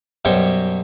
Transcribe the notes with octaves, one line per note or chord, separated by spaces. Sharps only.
F#2 B2 G3 C5 C#5 C#6